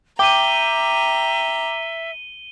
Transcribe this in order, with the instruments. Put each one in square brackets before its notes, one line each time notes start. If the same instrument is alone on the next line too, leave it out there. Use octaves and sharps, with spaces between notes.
[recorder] E5 [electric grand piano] G5 D6 [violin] A#5 [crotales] D#7 G7